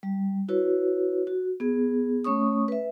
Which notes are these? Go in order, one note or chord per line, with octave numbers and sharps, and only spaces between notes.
G3
E4 F#4 B4 C#5
F#4
B3 G#4
A3 C#4 C#5 C#6 D#6
B4 E5